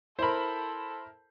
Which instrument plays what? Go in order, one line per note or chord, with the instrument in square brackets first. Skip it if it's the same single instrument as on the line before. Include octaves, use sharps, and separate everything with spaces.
[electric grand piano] E4 A#4 [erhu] A4 [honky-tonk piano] C5 B5